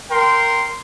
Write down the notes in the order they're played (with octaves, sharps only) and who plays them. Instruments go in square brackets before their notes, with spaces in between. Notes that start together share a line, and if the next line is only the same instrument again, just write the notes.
[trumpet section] A#4 G5 C6